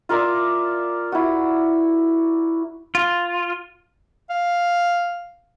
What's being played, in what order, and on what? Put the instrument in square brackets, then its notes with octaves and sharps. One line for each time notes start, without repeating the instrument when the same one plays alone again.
[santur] F4 A#4 D5 E5
E4 F#4
[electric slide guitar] F4
[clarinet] F5